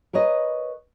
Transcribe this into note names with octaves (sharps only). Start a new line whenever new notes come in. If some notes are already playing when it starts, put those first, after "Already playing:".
A#4 B4 C#5 D#5